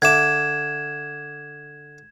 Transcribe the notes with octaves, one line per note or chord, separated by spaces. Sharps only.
D3 E5 D6 G#6 E7